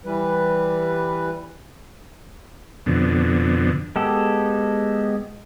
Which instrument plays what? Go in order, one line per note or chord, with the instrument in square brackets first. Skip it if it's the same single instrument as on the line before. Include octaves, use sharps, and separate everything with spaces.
[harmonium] E3 G3 B4
[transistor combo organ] F2 B2 D3
[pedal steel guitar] G#3 B3 G4 A4